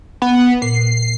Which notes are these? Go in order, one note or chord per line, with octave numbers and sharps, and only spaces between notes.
B3
A#2 C7